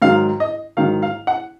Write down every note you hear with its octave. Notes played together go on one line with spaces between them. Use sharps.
G#2 D#3 F#3 F5
D#5
G#2 D#3 F#3 F5
F5
F#5